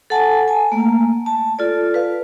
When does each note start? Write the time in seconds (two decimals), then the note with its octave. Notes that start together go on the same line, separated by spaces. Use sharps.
0.10 A4 F#5 G#5 A5
0.48 G#5 A5
0.72 A3 A#3
1.26 A5
1.59 F4 A4 D5
1.94 B4 F5